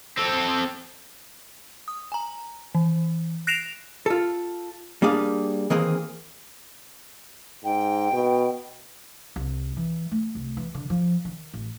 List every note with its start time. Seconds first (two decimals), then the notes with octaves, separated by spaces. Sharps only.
0.17 C4 A4
1.88 D#6
2.12 G#5 A#5
2.75 E3
3.47 F#6 A#6 C7 D7 E7 F7
4.06 F4 A4
5.02 G3 A#3 D4 G#4 F5
5.70 D#3 E3 A#3 C4 G#4
7.64 G#2 G5
8.12 B2
9.36 C2
9.77 E3
10.11 A3
10.35 C2
10.57 E3
10.75 D3
10.90 F3
11.25 D#3
11.53 A1